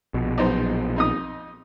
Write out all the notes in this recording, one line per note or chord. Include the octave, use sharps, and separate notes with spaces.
A#1 B2
B1 D#4 C5
F2 D#4 D#6